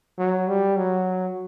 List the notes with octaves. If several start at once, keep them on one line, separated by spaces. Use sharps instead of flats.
F#3
G3
F#3